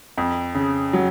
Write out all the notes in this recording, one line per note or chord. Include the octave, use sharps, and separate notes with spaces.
F2
C#3
F#3